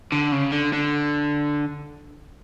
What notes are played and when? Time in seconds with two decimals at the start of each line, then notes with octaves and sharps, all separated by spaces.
0.12 D3
0.32 C#3
0.52 D3
0.73 D3